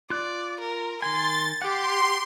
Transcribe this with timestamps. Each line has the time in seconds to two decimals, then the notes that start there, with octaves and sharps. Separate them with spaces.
0.10 F4 D5 F#6
0.60 A#4
1.02 D#3 A#4 G#5 C6 A6
1.62 G4 F#5 C6 D6